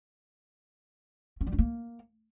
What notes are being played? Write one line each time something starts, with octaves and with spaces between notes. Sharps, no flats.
C#4
G3
C#4
A#3